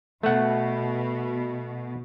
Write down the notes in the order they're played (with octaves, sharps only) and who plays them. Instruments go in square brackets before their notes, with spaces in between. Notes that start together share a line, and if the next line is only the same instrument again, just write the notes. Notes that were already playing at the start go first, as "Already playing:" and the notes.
[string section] B2 [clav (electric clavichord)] A3 F#5